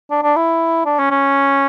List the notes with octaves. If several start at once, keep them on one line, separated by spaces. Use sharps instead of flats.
D4
D4
E4
D4
C#4
C#4